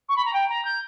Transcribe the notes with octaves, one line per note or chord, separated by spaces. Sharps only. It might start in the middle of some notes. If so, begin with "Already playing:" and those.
C#6
B5
A#5
G5
A#5
G6